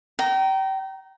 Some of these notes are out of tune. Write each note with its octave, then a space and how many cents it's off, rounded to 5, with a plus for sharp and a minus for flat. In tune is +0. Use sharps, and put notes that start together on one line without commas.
G5 -30 A#5 +0